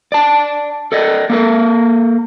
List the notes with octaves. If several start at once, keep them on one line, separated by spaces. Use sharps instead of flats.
D5 A5
A4 D5 D#5
A#3 A4 A#4